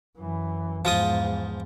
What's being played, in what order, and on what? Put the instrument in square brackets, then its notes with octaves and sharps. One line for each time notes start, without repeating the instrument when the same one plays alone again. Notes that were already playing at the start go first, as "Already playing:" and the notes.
[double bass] F#2 E3
[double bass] E2 G#2 [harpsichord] F3 F4 D#6